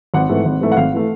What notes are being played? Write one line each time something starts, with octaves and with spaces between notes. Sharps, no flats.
G#1 F#5
G#2 E3 A3
G#1
G#2 E3 A3
F#5
G#1 F5
E3 A3